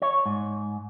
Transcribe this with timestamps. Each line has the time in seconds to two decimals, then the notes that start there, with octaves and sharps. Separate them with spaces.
0.02 C#5
0.26 G#2